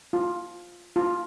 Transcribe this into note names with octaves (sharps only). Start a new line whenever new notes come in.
F4
F4